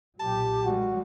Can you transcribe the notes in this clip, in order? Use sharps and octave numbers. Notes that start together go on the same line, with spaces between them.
B1 A#2 F#3 G4 A5
D#3 G3 G#3 F#4